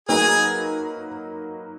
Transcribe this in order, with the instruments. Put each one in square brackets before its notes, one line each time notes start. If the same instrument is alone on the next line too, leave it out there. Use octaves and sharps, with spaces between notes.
[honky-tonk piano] F#3 A#3 D#4 F#4 B4 [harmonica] G#4 G#5